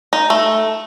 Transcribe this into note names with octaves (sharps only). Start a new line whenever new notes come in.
D#4
A3